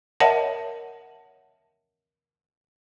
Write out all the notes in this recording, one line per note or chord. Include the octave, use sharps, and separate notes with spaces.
A#4 C#5 D#5 E5 F#5 A5